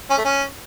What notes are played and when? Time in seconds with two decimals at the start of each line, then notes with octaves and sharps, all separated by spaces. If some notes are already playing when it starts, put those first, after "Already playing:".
0.10 C#4
0.18 A3
0.25 C#4